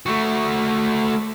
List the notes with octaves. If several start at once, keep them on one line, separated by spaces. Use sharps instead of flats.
A3 F#4